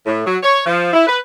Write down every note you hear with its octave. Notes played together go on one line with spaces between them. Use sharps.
A2
F#3
C#5
F3
E4
B4